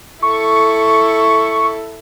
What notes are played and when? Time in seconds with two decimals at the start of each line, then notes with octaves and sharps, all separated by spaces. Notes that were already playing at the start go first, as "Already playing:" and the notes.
0.23 E4 A4 C#6